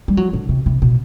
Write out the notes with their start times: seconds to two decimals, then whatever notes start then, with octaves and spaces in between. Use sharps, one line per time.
0.08 G3
0.17 F#3
0.33 D3
0.49 C3
0.66 C3
0.82 B2